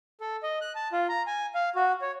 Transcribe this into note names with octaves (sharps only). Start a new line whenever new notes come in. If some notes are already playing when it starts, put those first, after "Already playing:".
A4
D#5
F#6
A5
F4
A#5
G#5
F5
F#4
C#5